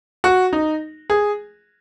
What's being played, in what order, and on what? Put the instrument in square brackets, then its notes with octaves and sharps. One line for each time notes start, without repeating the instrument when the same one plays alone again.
[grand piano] F#4
D#4
G#4